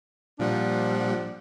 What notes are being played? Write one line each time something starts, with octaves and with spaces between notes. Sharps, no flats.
A#2 F3 G3 D4 F#5